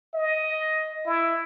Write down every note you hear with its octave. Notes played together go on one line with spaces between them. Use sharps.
D#5
E4